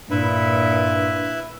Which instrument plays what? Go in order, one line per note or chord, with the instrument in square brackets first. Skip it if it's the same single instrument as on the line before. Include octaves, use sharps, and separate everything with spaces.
[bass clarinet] G2 [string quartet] A#2 [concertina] E4 B4 E5